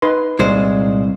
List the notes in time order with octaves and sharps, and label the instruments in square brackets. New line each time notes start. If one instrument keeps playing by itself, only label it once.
[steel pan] D#4 B4 C6
[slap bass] C2 [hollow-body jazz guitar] A#2 G#3 C5